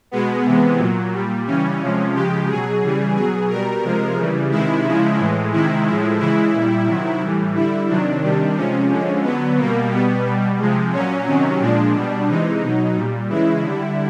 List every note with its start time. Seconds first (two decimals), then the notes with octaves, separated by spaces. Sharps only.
0.11 B2 G#3 B3
0.45 C3 E3 G#3
0.79 A#2 F#3
1.14 A#2 G3
1.47 C#3 E3 G3 C#4
1.81 C3 F3 G#3
2.14 C#3 F3 G#3 G4
2.48 B2 F#3 G#4
2.82 C#3 E3 G3
3.16 B2 F#3 G#4
3.50 B2 G3 A#4
3.83 C3 F3 G#3
4.17 C#3 E3 G3
4.51 C3 D#3 G#3 E4
4.85 C#3 F3 G#3
5.19 A2 E3 G#3
5.52 C3 D#3 G#3 E4
5.86 A2 F3 G#3
6.20 C#3 E3 G#3 E4
6.53 A#2 G3
6.87 C3 D#3 F#3
7.22 A2 E3 G3
7.55 D3 G3 E4
7.88 C3 D#3 F#3 D4
8.23 C3 D#3 G3
8.56 C3 F3 G#3 C#4
8.90 D3 F3 G#3
9.24 D3 F#3 B3
9.58 B2 G3 A#3
9.91 B2 G3 B3
10.26 B2 G3
10.59 C3 F3 G#3
10.93 A#2 F#3 C#4
11.27 C3 D#3 F#3
11.61 A#2 F3 G#3 D4
11.94 B2 G3
12.28 C3 E3 G#3 D#4
12.62 B2 F#3
12.96 A#2 G3
13.30 C#3 E3 G#3 E4
13.63 D3 G3